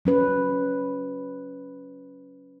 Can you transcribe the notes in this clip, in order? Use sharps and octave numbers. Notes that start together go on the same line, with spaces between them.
F#3 C#4 B4